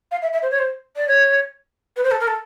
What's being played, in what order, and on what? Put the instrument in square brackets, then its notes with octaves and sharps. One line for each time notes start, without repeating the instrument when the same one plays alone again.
[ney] F5
E5
E5
C5
C#5
C5
D5
C#5
B4
C5
A4
A#4
A4